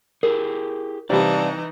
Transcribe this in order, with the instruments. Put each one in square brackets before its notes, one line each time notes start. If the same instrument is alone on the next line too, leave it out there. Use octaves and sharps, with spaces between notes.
[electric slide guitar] E4 G4 G#4 [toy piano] A#4
[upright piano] C3 G3 [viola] E3 D#4 [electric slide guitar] D5 F5 A5